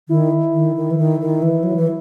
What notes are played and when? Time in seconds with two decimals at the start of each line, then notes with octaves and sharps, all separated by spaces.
0.09 D#3 E4
0.54 D#3
0.76 D#3
0.91 E3
0.98 D#3
1.20 D#3
1.42 E3
1.63 F#3
1.76 E3